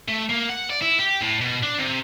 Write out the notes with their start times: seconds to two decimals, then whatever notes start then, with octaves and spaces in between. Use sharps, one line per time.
0.08 A3
0.29 A#3
0.49 F#5
0.70 D5
0.81 E4
0.99 G4
1.22 A2
1.42 B2
1.63 D4
1.78 C3